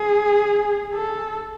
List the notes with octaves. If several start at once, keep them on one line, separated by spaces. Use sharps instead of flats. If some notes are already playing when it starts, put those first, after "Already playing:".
Already playing: G#4
A4